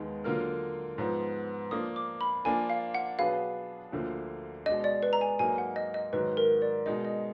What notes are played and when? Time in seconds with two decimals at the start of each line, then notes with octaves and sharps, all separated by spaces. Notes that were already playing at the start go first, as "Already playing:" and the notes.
Already playing: D#2 D#3 G#3 B3
0.24 D3 F#3 A#3 F4 A#4 F6
0.98 G#2 F3 B3
1.71 F3 A#3 D4 D#6
1.96 D6
2.21 B5
2.45 F3 A#3 D4 F4 G#5
2.70 F5
2.94 F#5
3.19 B2 F#3 D4 G#4 B4 F5
3.92 D2 D3 F3 A#3
4.66 B2 G#3 D4 D#5
4.84 D5
5.03 B4
5.13 A#5
5.21 G#5
5.39 G#2 F#3 A#3 D#4 A#4 G#5
5.58 F#5
5.76 D#5
5.94 D#5
6.13 G#2 D#3 F#3 B4
6.33 B4
6.37 A#4
6.62 D5
6.86 B2 G#3 D#4 D#5
7.04 D#5